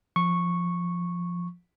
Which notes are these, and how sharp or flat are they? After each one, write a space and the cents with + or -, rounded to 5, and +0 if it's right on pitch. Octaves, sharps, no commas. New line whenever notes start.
F3 +0 C#6 -10